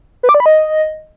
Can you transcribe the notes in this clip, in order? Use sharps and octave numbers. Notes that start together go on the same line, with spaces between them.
B4
D6
D5
B5
D#5